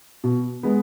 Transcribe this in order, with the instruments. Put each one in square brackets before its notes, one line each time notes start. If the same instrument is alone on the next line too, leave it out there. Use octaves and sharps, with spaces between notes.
[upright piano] B2
G#3 B3